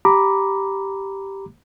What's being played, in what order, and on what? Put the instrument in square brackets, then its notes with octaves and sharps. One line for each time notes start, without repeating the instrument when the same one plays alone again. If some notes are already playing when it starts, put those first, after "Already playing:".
[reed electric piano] G4 A#5 B5 D6